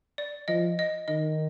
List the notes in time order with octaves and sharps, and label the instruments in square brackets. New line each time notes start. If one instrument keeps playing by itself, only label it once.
[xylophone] D5
[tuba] F3 [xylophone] D#5
[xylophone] D#5
[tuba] D#3 [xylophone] D#5